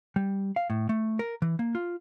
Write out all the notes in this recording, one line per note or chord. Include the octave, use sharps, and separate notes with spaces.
G3
F5
A2
A3
A#4
E3
A#3
F4